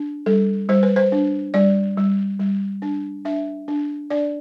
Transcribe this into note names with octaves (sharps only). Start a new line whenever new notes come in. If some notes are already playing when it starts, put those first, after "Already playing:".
Already playing: D4
G3 A4
G3 C5
B4
C5
D4
G3 D5
G3
G3
D4
D4 E5
D4
D4 D5